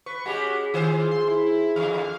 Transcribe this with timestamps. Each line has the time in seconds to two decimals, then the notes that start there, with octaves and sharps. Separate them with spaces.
0.06 B4 C#6
0.26 G#3 C#4 F#4 G4
0.74 D#3 F4 G#4 C5
1.11 C6
1.28 E4
1.76 E2 D3 F5